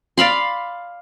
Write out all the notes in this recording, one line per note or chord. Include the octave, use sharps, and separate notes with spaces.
D5 F5 B5 C6